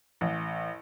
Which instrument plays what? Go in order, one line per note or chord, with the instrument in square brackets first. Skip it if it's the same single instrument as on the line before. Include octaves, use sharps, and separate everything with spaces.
[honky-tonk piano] A1